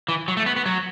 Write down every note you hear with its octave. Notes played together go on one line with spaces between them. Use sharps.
E3
F#3
A3
B3
B3
F#3